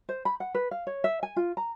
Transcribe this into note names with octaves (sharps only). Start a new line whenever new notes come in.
C5
B5
F#5
B4
F5
C#5
E5
G#5
F4
A#5